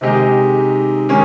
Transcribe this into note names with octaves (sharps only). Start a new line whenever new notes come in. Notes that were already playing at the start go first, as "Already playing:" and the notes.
C3 D#3 G#3 D#4 G4
D#3 G#3 C#4